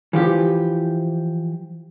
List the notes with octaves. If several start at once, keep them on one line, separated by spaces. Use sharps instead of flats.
E3 F3 G4